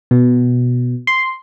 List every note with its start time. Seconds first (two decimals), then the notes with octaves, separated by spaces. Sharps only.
0.11 B2
1.07 C6